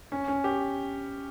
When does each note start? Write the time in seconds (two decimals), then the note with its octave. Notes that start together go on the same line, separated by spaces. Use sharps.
0.12 C#4
0.28 C#4
0.44 G4